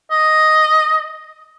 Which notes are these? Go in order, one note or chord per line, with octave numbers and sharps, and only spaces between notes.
D#5